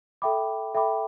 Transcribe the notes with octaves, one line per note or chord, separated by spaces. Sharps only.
A4 E5 G5 B5 D6
A4 E5 G5 B5 D6